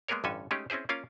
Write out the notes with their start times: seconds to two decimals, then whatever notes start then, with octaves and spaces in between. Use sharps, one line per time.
0.08 G#3 A#3 B3 G#4 A#4 C#5
0.24 A1 G2 D3 C#4 A4 G#5
0.51 G#3 A3 C#4 D#4 G4 G#4
0.70 C4 C#4 E4 G#4 C5
0.89 A#3 C#4 F4 A#4 F5